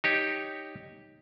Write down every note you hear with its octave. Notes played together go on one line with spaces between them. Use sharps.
D#4 G4 C#5